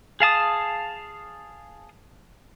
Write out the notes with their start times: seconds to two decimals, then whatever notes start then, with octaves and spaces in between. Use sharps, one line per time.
0.20 G#4 F5 A5 D#6